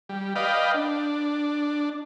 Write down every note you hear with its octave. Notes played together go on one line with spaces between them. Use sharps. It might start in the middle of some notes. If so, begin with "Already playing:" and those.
G3
B4 D5 D#5 F5 G5
D4